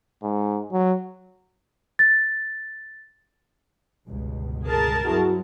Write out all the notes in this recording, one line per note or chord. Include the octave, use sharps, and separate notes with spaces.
G#2
F#3
A6
G1 C#2 B2
G#4 A#4 A5
G2 F#3 C4 E4 F#4